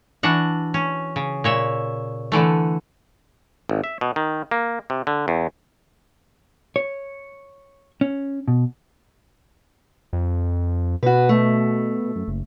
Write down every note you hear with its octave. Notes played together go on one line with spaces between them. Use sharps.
E3 D4 F#4 F#5
C#4
C#3
A#2 C#5 E5
D3 E3 A3
G#1
E5
B2
D#3
A#3
C3
D3
E2
C#5
C#4
B2
F2
B2 F#4 B4
A3
F#2
F#1